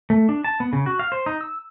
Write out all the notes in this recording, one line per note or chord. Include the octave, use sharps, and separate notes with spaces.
A3
D4
A5
B3
C#3
F#4
F5
C5
D#4
E6